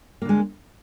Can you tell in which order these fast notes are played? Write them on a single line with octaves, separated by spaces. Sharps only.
A#3 D3 G#3